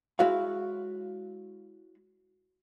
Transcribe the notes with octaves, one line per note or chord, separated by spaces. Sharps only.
G#3 E4 F#4 C#5 F5